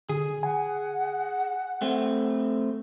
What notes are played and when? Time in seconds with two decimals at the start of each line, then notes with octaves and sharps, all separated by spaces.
0.10 D3 G#4
0.43 F#5 G#5
1.82 A3 C4